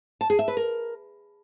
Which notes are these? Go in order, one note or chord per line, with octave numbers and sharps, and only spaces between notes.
A5
G#4
E5
B4
A#4